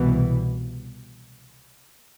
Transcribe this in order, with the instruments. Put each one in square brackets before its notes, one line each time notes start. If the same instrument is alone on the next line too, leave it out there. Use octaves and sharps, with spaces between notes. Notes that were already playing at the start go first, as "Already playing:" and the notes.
Already playing: [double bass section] C2 B2 E3